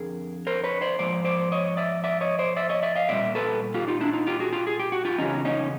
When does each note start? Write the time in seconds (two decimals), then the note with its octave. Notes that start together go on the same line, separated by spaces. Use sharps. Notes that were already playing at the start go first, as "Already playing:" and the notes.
Already playing: F2 D3 G#4 A#4
0.47 A#4 C5
0.64 B4 C#5
0.81 C5 D5
0.99 G#2 F3 C5 D5
1.25 C5 D5
1.52 C#5 D#5
1.77 D5 E5
2.04 D5 E5
2.21 C#5 D#5
2.39 C5 D5
2.56 D5 E5
2.69 C#5 D#5
2.83 D5 E5
2.96 D#5 F5
3.09 A#2 G3 D5 E5
3.35 A4 B4
3.74 F4 G4
3.88 D#4 F4
4.01 D4 E4
4.13 D#4 F4
4.27 F4 G4
4.40 F#4 G#4
4.53 F4 G4
4.67 G#4
4.79 G4
4.92 F#4
5.05 F4 G4
5.19 E2 C#3 F#3 C#4 D#4
5.45 C#4 D#4